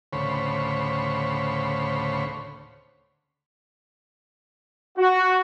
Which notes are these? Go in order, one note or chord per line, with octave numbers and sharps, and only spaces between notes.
D2 A2 C#3 C5 C#5 B5
F#4